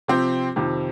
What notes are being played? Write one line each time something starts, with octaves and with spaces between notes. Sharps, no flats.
C3 F3 C4 G4
F2 C3 D#3